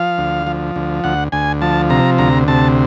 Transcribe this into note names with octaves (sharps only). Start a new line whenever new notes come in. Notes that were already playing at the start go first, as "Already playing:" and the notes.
Already playing: F3 F5
D2
F3
D2
D2 F#5
D2 G#5
F3 A5
C3 A#5
D2 A#5
C3 A5